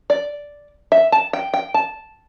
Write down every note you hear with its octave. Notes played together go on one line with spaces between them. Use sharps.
D5
E5
A5
G5
G5
A5